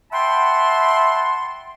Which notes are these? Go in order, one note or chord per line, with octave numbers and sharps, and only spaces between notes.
E5 F#5 G5 A5 B5 C6